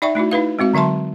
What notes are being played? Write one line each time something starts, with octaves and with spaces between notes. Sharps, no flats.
D#4 D5 E5 G5 C#6
A3 D#4 E4 F#4
D#4 E4 B4 F5
G#3 C4 F#4 F5
D3 F#3 E5 A5 C6